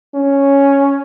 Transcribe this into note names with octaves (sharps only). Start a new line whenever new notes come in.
C#4